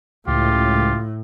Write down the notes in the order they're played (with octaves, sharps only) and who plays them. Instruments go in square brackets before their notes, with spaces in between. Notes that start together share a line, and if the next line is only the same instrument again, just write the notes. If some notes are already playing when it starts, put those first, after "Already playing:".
[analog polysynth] C#2 [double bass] A2 [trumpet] F4 [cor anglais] G4